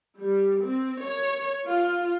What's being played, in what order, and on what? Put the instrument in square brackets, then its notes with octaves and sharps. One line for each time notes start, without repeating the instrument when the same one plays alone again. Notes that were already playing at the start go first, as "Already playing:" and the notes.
[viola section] G3
C4
C#5
F4